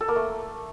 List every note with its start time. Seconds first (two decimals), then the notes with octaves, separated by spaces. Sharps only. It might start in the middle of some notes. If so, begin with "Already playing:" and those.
0.01 A4
0.08 A#3
0.16 A3